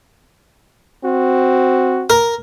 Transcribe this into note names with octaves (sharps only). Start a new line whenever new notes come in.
C4 F#4
A#4